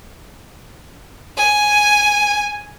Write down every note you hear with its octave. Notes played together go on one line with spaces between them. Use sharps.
G#5